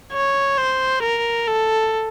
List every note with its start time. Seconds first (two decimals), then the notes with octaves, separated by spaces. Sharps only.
0.13 C#5
0.58 C5
1.03 A#4
1.48 A4